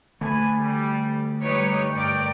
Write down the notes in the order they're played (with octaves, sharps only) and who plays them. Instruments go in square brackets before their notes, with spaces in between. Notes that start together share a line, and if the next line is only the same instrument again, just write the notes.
[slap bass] D3 A3 [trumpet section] G#5 B5
[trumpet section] G3
[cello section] G3 B4 C#5 [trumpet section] D#4 C#6
[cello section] G2 A#4 D5 [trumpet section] G5